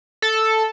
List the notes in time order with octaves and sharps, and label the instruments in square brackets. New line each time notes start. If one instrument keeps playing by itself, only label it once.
[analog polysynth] A4